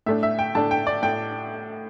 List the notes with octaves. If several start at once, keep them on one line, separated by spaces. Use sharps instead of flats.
A2 A3 D4 E5
E5
G5
A2 A3 D4 A5
G5
D5
A2 G5